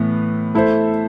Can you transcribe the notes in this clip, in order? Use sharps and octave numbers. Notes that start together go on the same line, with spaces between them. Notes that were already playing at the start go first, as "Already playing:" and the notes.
Already playing: A2 E3 B3
A3 E4 A4 C5